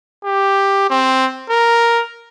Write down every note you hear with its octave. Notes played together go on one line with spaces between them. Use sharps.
G4
C4
A#4